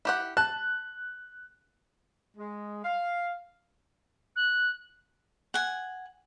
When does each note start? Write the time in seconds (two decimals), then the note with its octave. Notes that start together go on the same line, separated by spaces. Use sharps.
0.05 E4 G4 F#5
0.37 A5 F#6
2.37 G#3
2.85 F5
4.36 F#6
5.54 F#5 G#5